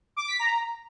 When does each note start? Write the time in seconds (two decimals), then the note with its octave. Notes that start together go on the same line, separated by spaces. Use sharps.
0.16 D6
0.28 B6
0.39 A#5